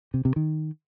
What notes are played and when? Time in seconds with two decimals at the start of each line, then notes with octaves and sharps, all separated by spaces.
0.14 C3
0.25 C3
0.36 D#3